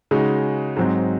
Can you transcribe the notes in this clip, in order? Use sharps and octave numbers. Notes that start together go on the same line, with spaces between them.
C#3 G#3 D#4 F#4
G#2 F#3 C4 D#4